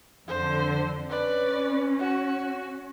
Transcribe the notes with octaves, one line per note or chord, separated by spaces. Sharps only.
F2 D3 C5
C#4 B4 D5
F#4